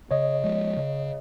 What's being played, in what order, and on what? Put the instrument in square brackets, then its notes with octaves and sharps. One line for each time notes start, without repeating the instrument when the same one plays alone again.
[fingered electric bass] C#3 [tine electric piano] C#5 D#5
[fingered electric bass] F3 G#3
C#3